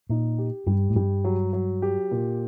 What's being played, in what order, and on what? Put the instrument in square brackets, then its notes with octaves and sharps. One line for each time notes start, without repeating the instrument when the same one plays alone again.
[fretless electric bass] A#2 [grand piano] D#4
[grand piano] G4
[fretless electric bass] G2 [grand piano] G3
[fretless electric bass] A2
[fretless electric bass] G2 [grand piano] G3
[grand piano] F#3
F#3
G4
A#2